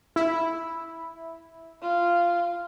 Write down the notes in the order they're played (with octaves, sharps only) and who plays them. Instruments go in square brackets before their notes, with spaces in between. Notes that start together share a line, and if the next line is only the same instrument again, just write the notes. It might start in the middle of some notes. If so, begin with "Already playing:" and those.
[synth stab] E4
[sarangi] F4